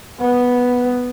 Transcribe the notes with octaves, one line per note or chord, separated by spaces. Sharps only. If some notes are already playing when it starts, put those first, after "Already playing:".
B3